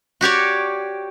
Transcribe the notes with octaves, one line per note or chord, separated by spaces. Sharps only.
F#4 G4 C#5 D5